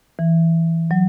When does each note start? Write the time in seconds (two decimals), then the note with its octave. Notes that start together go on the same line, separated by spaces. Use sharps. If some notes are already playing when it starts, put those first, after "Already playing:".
0.19 E3
0.91 F#3